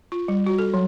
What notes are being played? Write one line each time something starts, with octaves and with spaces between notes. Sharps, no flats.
F4
G3
F#4
A4
F#3